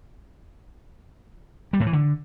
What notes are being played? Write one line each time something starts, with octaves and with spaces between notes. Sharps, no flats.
G3
A2
E3
D3